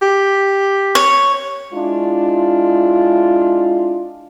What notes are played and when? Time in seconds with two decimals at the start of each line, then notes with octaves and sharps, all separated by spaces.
0.02 G4
0.95 C#5
1.73 G#3 D4 E4 F4